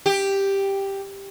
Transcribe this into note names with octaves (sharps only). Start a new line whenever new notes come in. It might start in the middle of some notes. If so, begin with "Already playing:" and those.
G4